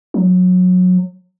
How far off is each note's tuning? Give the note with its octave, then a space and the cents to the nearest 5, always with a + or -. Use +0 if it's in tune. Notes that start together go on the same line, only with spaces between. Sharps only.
F#3 -25